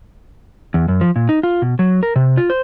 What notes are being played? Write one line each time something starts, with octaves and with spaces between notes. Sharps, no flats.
E2
F#2
F3
A#2
D#4
F4
B2
F#3
A#4
C3
F4
C5